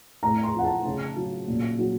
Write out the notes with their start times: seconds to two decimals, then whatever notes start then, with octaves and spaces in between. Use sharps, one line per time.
0.23 A2 A#5
0.43 C6
0.54 F3 F#5
0.64 A5
0.85 C#3
1.16 F#3
1.47 A#2
1.79 F#3